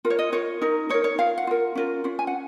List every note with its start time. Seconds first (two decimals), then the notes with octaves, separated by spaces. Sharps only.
0.05 F4 A#4
0.10 C#5
0.19 D#5
0.32 F4 A#4 C#5
0.62 D#4 A#4
0.89 D#4 A#4 C#5
1.04 C#5
1.18 F4 A#4 F5
1.38 F#5
1.47 F4 A#4
1.75 C#4 F4 A#4
2.04 C#4 F4
2.19 G#5
2.27 F#5